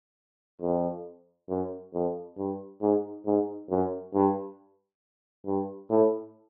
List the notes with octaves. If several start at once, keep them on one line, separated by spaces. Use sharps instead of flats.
F2
F#2
F2
G2
G#2
G#2
F#2
G2
G2
A2